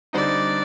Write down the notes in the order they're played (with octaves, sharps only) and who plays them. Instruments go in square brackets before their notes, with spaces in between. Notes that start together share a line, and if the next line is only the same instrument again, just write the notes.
[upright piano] D3 G3 C4 D#4 [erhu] D5